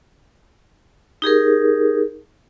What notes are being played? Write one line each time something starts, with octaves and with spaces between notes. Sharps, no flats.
D#4 G4 G#4 A#4